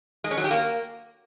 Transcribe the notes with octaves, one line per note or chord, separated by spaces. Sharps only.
G#3
C#4
F#3
G4
A#3